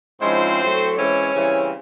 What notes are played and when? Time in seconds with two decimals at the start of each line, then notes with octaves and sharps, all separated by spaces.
0.21 G#2 F3 G#3 C4 C#4 E4 C5
0.59 A2 F#3 A3
0.96 E3 G#3 C4 C#4 E4 C#5
1.34 C#3 E3 G3 C4 E4